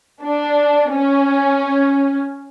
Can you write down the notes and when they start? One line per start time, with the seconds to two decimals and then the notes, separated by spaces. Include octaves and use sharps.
0.22 D4
0.92 C#4